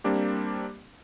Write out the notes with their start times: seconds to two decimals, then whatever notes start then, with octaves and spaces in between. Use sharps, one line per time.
0.04 G3 A#3 C4 D4 G4